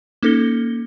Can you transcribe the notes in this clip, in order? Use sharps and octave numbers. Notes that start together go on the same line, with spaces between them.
A#3 C#4 D#4 A4 A#6 G7